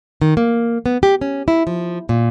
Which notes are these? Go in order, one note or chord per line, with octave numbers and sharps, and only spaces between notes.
D#3
A#3
B3
G4
C#4
E4
F3
A#2